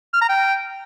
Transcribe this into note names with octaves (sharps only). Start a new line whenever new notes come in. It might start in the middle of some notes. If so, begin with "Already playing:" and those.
F6
A#5
G5